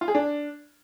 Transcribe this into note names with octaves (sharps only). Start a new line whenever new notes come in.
F4
G#4
D4